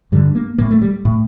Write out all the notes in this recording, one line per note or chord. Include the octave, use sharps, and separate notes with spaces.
G2 D3 G3
A#3
A2 A#3
A3
G3
A2